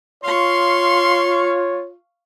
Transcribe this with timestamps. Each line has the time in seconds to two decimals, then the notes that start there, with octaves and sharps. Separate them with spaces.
0.24 F4 C#5 F5 C6 C#6